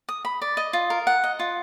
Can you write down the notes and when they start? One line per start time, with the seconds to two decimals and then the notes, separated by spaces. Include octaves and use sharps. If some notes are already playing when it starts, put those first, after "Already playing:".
0.09 D#6
0.25 B5
0.41 D5
0.57 D#5
0.73 F4
0.90 A#4
1.07 F#5
1.24 D#5
1.39 F4